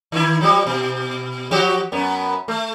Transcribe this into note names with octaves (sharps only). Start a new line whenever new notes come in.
D#3 E4
F3 G3
B2
F3 F#4 G4
F#2 B3
A3